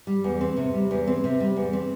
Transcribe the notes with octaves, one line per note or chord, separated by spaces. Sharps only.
G3
E2
C4
C3
G3
E2
C4
C3
G3
E2
C4